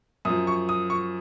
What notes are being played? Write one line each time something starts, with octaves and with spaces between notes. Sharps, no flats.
F#2 F3 D#6
C#6
D#6
C#6